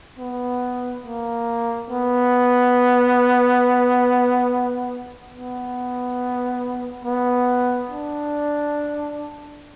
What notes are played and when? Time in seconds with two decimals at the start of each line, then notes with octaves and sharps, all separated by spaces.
0.18 B3
1.05 A#3
1.90 B3
5.34 B3
7.05 B3
7.90 D4